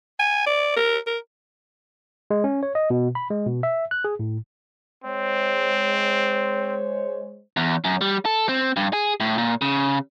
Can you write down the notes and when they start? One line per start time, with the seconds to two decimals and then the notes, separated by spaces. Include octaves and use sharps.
0.19 G#5
0.46 D5
0.76 A#4
1.07 A#4
2.31 G#3
2.44 C#4
2.63 C#5
2.75 D#5
2.90 B2
3.15 B5
3.30 G#3
3.47 B2
3.63 E5
3.91 F#6
4.04 G#4
4.19 A2
5.04 G#3 C4 C5 C#5
7.57 E2
7.85 F#2
8.01 G3
8.25 A4
8.49 C4
8.77 G2
8.93 G#4
9.20 A2
9.38 A#2
9.62 C#3